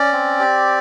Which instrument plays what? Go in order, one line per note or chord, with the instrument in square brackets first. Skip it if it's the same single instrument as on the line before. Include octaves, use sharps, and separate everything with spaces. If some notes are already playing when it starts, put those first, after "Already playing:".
Already playing: [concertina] C#4 D5
C4
G4